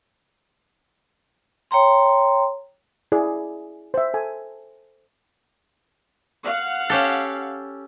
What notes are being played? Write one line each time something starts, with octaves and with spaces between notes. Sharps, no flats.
C#5 G5 A#5 C6
E4 G#4 D5
C5 E5
A4 G#5
F5 F#5
C#4 G4 A4